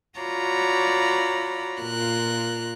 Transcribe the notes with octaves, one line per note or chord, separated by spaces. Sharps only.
F4 F#4 C#5 D5 A#5 B5
A#2 F4 A#4 F#6